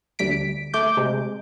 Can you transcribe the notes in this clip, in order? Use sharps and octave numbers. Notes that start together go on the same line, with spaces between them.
D2 G3 B6 D7
A3 D6 G6
C3 G#3